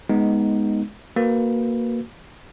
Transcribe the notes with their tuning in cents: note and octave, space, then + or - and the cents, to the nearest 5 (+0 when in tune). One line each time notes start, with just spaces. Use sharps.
G#3 +10 B3 +0 D#4 +0
A#3 +0 F#4 +0 B4 +0